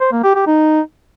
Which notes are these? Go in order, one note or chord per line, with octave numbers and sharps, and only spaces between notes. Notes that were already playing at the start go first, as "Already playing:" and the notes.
C5
A#3
G4
G4
D#4